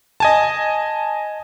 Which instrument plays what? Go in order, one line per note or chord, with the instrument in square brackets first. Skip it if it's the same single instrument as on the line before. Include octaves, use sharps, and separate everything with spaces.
[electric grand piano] D#5 G#5 A5